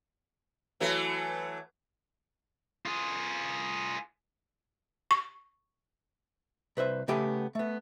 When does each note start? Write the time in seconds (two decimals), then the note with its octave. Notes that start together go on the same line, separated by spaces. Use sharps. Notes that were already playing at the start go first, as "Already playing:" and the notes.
0.80 E3 F#3 A3
2.86 F4 G#4
5.11 C#6
6.77 C2 B4 C5 E5
7.08 C#3 A3 B3 G4 G5 G#5
7.55 A3 B3